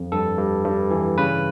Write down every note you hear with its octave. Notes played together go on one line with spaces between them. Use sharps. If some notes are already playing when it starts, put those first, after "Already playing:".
Already playing: F2
G2 A4
G2
G2
E3
C#3 B4